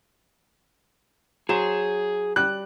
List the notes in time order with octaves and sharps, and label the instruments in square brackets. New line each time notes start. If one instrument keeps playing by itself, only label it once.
[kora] F#3 C5 [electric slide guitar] G#4 [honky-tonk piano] E7
[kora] G3 [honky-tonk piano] F#6